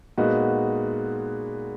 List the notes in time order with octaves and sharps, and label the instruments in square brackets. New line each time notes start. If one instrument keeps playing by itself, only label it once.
[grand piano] A#2 G#3 B3 D#4 F#4